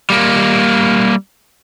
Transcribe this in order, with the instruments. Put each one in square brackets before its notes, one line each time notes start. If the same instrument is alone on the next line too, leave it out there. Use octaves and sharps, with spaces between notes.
[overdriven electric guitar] G3 A#3